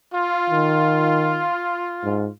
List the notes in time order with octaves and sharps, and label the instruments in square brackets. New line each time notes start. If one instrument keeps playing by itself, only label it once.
[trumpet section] F4
[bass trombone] D#3
G#2